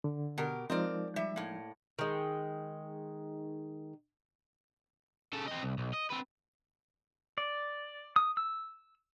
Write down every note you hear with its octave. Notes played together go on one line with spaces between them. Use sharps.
D3
B2 G4 A#4
F3 G#3 C4 D#4 A#4 D5
G3 E5
A2 A#3
D#3 G#3
C#3 A4
C4 D#5
C2
B1
D#5
C4 B4
D5
D#6
E6